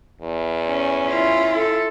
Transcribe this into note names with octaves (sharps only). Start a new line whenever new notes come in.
E2
C#4
E4 F4
A4